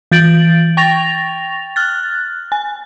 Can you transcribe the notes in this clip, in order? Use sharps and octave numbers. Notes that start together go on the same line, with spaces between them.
E3 G6 A6 D7 F#7
G5 C#6 A6 A#6 F7
F6 F#6 A6
G#5